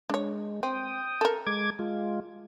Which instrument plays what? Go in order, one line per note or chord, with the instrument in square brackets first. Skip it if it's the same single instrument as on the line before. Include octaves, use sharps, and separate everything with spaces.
[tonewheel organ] G#3 [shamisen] D4 C#5
[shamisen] C4 [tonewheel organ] G5 D#6
[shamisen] A4 A#4
[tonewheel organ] G#3 D6 G#6
G#3 F4